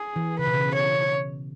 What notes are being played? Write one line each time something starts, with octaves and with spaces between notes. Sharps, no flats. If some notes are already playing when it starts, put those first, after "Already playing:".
Already playing: G#4
E3
C#3 B4
B2
C#3
C#5